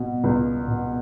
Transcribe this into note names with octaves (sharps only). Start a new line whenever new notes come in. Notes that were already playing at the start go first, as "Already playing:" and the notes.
Already playing: B2
C#2
B2